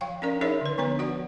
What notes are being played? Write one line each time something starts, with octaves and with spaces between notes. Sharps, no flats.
F3 F5 G5
C#4 D4 A#4 D5
D#4 G#4 A#4 C#5 D5 E5
D3 B4
F3 B3 D4 B4 C#5
F#4 D5 F#5